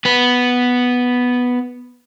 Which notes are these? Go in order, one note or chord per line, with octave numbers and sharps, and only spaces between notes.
B3 B4